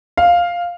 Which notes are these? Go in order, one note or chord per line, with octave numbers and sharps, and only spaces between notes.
F5